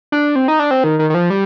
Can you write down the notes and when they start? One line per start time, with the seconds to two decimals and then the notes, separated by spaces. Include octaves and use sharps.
0.12 D4
0.36 C4
0.48 D#4
0.59 D4
0.71 C4
0.84 D#3
0.99 D#3
1.10 D#3
1.14 F3
1.30 G3